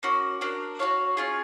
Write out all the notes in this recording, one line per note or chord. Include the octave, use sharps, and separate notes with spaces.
A#3 C#4 F#4
D4 F#4 A#4
F#4 A4 C#5 F5
C#4 F4 G#4